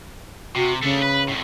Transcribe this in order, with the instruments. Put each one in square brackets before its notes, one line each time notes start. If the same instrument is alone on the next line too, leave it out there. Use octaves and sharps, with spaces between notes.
[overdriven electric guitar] C3 [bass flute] F#4
[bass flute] C#3 [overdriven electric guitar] A3 D4
[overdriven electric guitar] B4
F2 A2